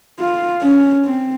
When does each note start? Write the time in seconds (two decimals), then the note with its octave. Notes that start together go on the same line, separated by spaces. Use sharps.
0.20 F4
0.62 C#4
1.05 C4